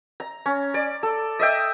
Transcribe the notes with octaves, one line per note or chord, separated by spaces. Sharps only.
A#5
C#4
D5
A4
D#5 E5 G5